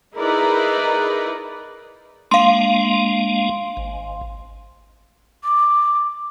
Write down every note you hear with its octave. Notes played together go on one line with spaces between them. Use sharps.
D#4 E4 G#4 A#4 B4 D5
G#3 A#3 D4 F5 C6
G#1
D6